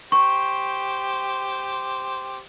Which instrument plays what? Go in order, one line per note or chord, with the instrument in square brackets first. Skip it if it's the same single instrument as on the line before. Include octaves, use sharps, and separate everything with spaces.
[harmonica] G4 C5 [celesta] C#6